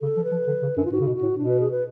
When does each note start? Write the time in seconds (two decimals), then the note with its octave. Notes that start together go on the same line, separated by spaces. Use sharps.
0.01 C#3 A4
0.16 F3
0.24 B4
0.31 F3
0.47 D3
0.62 C#3
0.77 F#2 D4
0.85 F4
0.92 G#2 F#4
1.00 C#3
1.07 B2
1.15 F#4
1.22 A2
1.38 B2 D4
1.49 B4
1.60 G#4
1.71 B4